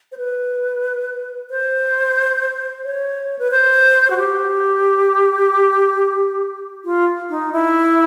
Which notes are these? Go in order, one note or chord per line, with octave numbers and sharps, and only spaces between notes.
C5
B4
C5
C#5
B4
C5
F#4
G4
F4
D#4
E4